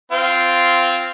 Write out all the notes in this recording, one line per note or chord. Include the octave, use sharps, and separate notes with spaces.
C4 F4